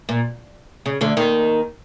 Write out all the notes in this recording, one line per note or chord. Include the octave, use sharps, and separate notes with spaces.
A#2
C#3
D2 D3
D#2 D#3